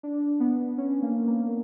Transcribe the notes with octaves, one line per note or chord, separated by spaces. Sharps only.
D4
B3
C#4
A#3
A#3